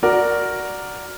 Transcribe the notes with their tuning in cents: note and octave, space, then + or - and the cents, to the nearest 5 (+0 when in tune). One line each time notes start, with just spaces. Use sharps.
F#4 +0 A#4 +0 D5 +0